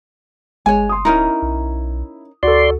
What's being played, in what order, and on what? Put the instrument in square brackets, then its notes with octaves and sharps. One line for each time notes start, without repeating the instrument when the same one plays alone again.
[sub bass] G1 [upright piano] G#3 [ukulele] C#5 G#5
[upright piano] C6 D#6
[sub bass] D1 [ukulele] C#4 D#4 A#4 [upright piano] E4
[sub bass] B1
[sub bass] D2 [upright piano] F#4 A4 [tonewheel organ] D5 C6